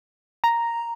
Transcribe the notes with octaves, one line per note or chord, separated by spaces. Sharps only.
A#5